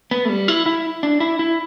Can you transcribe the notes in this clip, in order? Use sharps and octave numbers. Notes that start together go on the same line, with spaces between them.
B3
A3
G3
E4
E4
D4
E4
E4